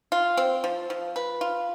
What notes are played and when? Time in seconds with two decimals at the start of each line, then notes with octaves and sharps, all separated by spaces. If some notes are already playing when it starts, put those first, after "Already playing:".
0.12 F4
0.37 C4
0.64 F3
0.90 F3
1.16 B4
1.41 F4